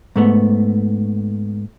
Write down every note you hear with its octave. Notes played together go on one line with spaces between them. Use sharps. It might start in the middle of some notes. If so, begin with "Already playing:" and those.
G#2 A3 B3